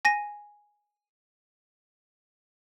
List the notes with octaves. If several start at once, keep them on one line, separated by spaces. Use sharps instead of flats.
G#5 A#6 D#7